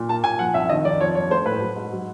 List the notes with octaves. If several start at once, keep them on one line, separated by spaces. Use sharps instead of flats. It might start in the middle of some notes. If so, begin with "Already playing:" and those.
Already playing: A#2
A#3 A5
A#2 G#5
F3 F#5
C2 E5
D#3 D#5
F2 D5
F3 C#5
G2 C#5
A3 C5
A2 B4
F#3
G#2
F#3